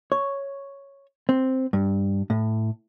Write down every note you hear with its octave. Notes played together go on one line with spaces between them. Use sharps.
C#5
C4
G2
A2